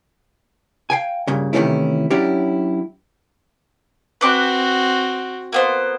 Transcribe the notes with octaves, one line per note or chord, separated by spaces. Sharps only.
F5 G5 G#5
G2 A#2 C#3
C3 D#3 E3 A3 C#4 E4
F#3 C#4 D4 E4 G4
C4 F#4 B4 D6 F#6
A#3 B3 C5